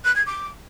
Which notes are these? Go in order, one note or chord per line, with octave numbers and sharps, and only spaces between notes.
F#6
G#6
D6